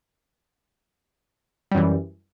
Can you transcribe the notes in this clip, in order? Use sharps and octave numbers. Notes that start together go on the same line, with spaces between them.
F#2 E3 G3